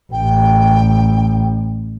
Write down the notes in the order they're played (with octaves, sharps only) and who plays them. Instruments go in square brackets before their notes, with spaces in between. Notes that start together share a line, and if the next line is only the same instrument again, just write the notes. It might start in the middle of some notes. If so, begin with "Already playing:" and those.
[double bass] A1 [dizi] G5